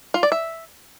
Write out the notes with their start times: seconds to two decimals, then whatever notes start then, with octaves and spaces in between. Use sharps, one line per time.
0.14 F4
0.23 D5
0.32 E5